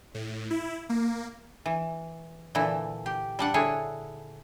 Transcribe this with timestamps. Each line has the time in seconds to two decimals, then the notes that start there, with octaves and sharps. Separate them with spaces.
0.14 A2
0.50 E4
0.89 A#3
1.66 E3
2.55 A#2 D3 E3 E4
3.06 G4
3.39 G3 D4 F#5
3.54 D3 E4 G#4 C#5